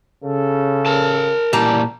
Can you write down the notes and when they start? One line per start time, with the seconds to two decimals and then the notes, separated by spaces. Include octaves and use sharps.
0.24 C#3 A4
0.86 A#4 A5
1.53 A#2 E3 G3 A#3 A5 A#5